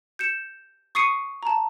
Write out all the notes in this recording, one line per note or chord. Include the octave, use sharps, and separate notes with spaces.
G6 C#7 E7
C#6 D#6 C7 C#7 D#7
A5 A#5